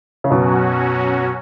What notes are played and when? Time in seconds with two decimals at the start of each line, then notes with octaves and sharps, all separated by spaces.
0.24 C#3
0.30 F#2 B2 F#3 C#4 F#4